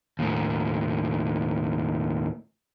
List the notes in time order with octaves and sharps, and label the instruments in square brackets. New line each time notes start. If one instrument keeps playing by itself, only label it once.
[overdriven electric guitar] D#2 A2